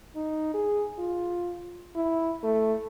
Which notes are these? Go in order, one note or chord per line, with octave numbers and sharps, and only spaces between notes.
D#4
G#4
F4
E4
A3